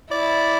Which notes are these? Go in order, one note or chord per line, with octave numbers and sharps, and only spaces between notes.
E4 D5